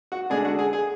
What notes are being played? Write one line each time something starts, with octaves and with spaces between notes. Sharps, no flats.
F#4
D3 G#3 D4 G#4
F#4
G#4
G#4